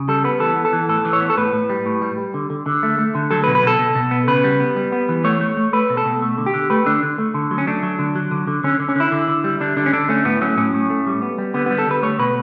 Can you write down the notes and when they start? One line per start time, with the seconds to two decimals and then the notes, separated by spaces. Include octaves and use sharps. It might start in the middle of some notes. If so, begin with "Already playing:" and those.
Already playing: C#3
0.08 G3 A4
0.24 B3 B4
0.40 E3 A4
0.56 B3
0.65 A4
0.73 E3
0.89 A2 A4
1.05 E3
1.13 C#5
1.21 B3
1.30 A4
1.37 A2 B4
1.53 A2
1.69 G3
1.86 A2
2.02 G3
2.18 G3
2.34 D3
2.50 D3
2.66 D3
2.83 A3
2.99 A3
3.15 D3
3.31 F#3 A4
3.44 B4
3.47 B2
3.55 B4
3.63 B2 A4
3.79 B2
3.95 B2
4.11 B3
4.28 C#3 B4
4.44 G3
4.60 B3
4.76 G3
4.92 B3
5.09 E3
5.24 A3 C#5
5.41 A3
5.57 A3
5.73 A3 B4
5.90 B2
5.97 A4
6.06 B2
6.22 A3
6.38 D3
6.46 G4
6.54 D3
6.70 A3 B4
6.86 D3 D4
7.03 D3
7.19 A3
7.34 D3
7.51 F#3
7.58 C#4
7.67 A3 D4
7.83 F#3
7.99 D3
8.15 F#3
8.31 D3
8.47 D3
8.64 D3 C#4
8.80 D3
8.89 C#4
8.96 D3 E4
9.12 D3
9.28 D3
9.44 G3
9.60 D3 D4
9.77 D3 D4
9.86 C#4
9.93 D3 D4
10.09 A3 C#4
10.25 A2 B3
10.41 F#3 C#4
10.58 A2 C#4
10.74 A2
10.90 A3
11.07 G3
11.22 B3
11.38 G3
11.54 D3 B3
11.66 G3 B3
11.78 A4
11.87 D3 B4
12.03 A3 C#5
12.19 B2 B4